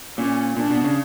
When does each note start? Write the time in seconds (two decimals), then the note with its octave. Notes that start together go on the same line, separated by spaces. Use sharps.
0.18 A#2 C#4
0.57 A#2 D4
0.70 B2
0.84 C#3